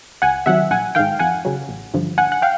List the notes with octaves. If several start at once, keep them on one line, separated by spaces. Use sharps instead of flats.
C#2 F#5 G#5
C3 D#3 F#3 E5 F#5
A#1 F#5 G#5
G#2 D#3 F5 G5
F2 F#5 G#5
C#3 F#3
A1
G2 D3 F3
A#1 F#5 G#5
F#5
F5 G5